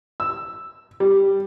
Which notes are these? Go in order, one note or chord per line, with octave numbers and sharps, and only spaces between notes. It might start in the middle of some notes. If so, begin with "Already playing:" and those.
E6
G3